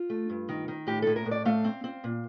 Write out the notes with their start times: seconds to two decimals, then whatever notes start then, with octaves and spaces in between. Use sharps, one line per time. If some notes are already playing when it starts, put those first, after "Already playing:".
Already playing: F4
0.10 A3
0.30 G2
0.49 D#3
0.68 D#3
0.87 A2 G4
1.02 A2 A4
1.16 A#4
1.26 A2
1.31 D5
1.45 A3 F5
1.64 C4
1.84 C4
2.04 A#2